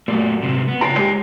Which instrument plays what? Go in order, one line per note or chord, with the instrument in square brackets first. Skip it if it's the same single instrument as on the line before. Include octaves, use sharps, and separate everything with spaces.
[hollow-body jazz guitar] F#2 A#2 [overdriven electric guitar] G3 A3
[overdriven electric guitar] G#2 C3
B3
[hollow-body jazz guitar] C#2 F4 A#5 [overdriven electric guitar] C#5 G5
[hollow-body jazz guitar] G#3 G4